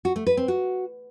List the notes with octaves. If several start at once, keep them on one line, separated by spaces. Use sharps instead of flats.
F#4
A3
B4
C4
F#4